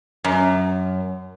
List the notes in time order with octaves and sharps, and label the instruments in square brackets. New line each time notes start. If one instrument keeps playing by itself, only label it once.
[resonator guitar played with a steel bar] F#2